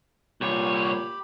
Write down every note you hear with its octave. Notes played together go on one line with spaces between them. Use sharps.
C2 A#2 G4 C#5 B5